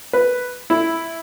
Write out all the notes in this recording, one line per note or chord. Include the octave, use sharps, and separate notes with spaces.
B4
E4